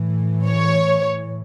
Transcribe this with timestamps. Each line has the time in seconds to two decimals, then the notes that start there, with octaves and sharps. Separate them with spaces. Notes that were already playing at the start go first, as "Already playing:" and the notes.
Already playing: A2 E3
0.47 C#5